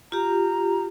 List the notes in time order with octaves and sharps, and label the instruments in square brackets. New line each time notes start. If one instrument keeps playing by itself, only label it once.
[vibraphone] F4 G4 [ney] A#5